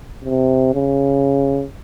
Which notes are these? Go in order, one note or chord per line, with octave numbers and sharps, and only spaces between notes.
C3
C#3